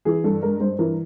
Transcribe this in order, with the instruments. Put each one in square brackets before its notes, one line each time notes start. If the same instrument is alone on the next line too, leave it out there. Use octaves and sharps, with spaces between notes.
[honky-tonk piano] E3 G#4
G2 A4
G#3 A#4
G2 C5
E3 A#4